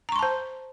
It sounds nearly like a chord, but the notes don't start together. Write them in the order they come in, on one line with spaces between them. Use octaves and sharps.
A#5 C#6 C6 A5 C5